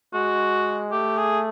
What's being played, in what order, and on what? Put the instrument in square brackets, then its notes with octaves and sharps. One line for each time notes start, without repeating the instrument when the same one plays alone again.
[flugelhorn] G#3 [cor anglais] F#4
[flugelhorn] A3 [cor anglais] G4
[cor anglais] G#4